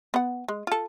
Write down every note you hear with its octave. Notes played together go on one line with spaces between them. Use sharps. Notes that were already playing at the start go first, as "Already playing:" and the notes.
B3 F#5
G#3
F4 A4